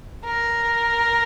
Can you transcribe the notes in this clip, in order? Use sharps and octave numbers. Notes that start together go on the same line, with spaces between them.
A#4